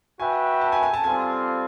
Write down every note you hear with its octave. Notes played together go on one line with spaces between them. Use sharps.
F#4 B4 E5 G5 G#5
A5
G#5
G#5
A5
G3 C4 F4 A4 G#5